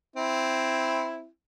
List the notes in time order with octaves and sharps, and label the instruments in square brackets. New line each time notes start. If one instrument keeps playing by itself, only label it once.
[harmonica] C4 E4